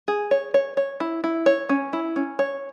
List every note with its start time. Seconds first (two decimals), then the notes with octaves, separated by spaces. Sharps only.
0.08 G#4
0.31 C#5
0.54 C#5
0.77 C#5
1.00 E4
1.24 E4
1.46 C#5
1.69 C#4
1.93 E4
2.16 C#4
2.39 C#5